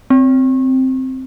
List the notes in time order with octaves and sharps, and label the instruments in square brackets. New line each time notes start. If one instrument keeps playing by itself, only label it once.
[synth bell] C4